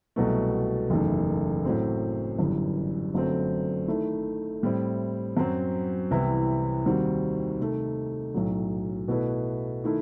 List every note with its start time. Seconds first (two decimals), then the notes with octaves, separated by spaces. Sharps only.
0.16 C2 B2 F#3 A3
0.90 F#1 E2 D#3 A3
1.65 A2 F#3 C4
2.38 G1 F#2 E3 G3
3.14 G1 F#2 F#3 A3 C4
3.88 D#3 A3 E4
4.63 A2 G3 C4 E4
5.37 F#2 F#3 C4
6.11 C2 C3 E3 B3 E4
6.85 D#2 D#3 G3 C4 F#4
7.60 C3 D#3 A3
8.34 B1 A2 F#3
9.08 B2 A3 E4 B4
9.84 D#3 A3 E4